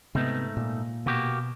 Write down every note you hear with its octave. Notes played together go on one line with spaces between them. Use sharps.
G#2 C3 A3 B3 D#4
A#2
B2 A#3 F#4 G4